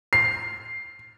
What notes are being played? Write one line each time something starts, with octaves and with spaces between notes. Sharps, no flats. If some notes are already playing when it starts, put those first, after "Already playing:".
C7